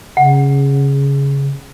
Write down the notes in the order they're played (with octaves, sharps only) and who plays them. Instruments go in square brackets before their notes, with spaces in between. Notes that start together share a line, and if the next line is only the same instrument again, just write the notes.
[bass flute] C#3 [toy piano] F#5